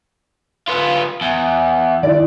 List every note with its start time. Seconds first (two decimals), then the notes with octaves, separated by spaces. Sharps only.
0.68 B3 F4
1.21 E2
2.03 D#3 E4 D5